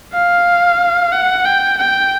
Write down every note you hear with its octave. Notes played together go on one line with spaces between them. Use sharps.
F5
F#5
G5
G5